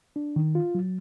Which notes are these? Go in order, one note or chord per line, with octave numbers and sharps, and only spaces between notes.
D4
D#3
F4
F#3